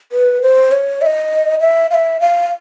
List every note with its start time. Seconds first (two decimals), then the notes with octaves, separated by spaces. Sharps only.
0.12 B4
0.42 C5
0.72 C#5
1.02 E5
1.06 D#5
1.60 E5
1.91 F5
1.94 E5
2.20 F5